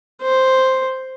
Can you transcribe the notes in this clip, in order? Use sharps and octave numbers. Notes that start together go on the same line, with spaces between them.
C5